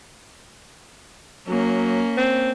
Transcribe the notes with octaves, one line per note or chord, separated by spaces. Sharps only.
F#3 A#3 C#4
C4